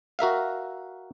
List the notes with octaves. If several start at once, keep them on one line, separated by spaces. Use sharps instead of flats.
F#4 A#4 E5 F5